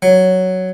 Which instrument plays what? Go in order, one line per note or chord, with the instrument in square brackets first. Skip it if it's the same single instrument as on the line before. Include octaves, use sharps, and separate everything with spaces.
[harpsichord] F#3